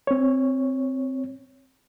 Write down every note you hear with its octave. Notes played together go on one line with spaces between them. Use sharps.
C4 C#5